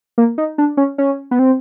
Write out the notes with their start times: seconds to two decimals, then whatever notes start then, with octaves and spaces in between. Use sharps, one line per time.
0.18 A#3
0.38 D#4
0.58 D4
0.77 C#4
0.98 C#4
1.31 B3
1.39 C4